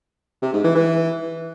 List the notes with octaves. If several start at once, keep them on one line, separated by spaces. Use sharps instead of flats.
C3
G#2
E3
E3